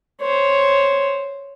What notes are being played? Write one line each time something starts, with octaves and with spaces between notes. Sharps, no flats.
C5 C#5